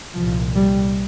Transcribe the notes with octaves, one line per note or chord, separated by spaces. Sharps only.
C2 A#2 F3
G3